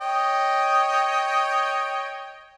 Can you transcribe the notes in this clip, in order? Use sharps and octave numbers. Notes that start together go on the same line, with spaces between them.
C#5 D#5 G5